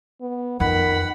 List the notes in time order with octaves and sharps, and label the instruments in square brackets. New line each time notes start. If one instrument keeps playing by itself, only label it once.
[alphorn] B3
[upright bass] F2 [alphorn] D#3 [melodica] F#5 [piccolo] B5